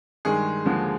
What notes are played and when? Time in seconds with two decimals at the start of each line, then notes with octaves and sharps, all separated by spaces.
0.25 G2 D#3 G#3 G#4
0.66 D#2 D3 F3 G#3